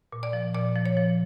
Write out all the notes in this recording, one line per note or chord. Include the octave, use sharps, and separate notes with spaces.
A#2
D5
F3
A#2 D5
F3
C#5
F3